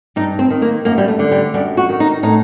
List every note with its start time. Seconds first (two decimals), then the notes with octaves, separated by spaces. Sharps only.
0.16 G2 D#4
0.39 C4
0.50 D#3
0.62 A#3
0.85 F#2 A#3
0.98 G3
1.08 A3
1.19 D3
1.31 G3
1.54 F#2 G3
1.77 F#4
1.89 D#3
2.00 D#4
2.23 A2 D#4